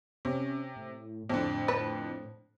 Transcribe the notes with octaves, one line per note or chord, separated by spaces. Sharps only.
C3 C#4
A2
F2 A2 D3
D4 B4